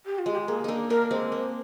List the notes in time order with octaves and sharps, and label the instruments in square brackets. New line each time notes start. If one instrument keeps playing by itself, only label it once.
[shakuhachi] G4
F4
[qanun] G#3
[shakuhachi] G4
[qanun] A#3 [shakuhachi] G#4
[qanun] A#3 D4 D#4
[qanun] A#3 D4 [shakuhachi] A#4
[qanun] G#3 C4
[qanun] A#3 [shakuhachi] C5